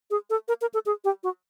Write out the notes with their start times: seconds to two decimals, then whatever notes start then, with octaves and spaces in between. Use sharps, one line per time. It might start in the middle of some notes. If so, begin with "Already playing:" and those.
0.11 G#4
0.30 A4
0.48 A#4
0.61 A#4
0.74 A4
0.86 G#4
1.04 G4
1.23 F#4